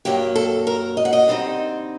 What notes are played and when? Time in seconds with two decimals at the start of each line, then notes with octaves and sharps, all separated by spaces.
0.05 G2 F#3 A#3 G4
0.35 A4
0.67 A#4
0.97 D#5
1.05 F#5
1.13 D#5
1.28 D3 G3 C4 D#4